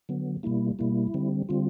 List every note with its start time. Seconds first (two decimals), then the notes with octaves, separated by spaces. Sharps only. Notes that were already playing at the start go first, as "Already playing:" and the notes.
0.09 D3 F#3 B3
0.43 B2 G3 A#3 E4
0.79 B2 G3 A#3 E4
1.14 D3 G3 C4
1.49 D3 G3 C4 F4